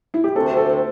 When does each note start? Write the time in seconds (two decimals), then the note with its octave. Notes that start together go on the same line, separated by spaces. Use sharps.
0.14 E4
0.24 G4
0.35 D2 C3 A3 C4 A4
0.57 A4